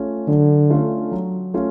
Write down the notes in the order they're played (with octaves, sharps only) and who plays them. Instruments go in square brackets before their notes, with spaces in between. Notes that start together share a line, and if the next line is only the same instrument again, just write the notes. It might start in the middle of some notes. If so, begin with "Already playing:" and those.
Already playing: [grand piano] A3 C#4 F4
[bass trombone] D3 [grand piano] F#3
[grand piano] A3 C#4 F4
F#3
A3 C#4 F4